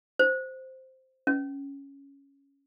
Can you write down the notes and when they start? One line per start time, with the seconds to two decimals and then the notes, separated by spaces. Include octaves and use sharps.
0.19 C5
1.27 C#4